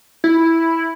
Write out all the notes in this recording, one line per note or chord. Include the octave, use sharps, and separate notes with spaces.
E4